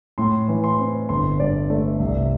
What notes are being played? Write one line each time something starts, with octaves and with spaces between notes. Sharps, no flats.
A2 C6
E3
C6
C4
G1 C6
G2 D5
A3 D5
C2 E5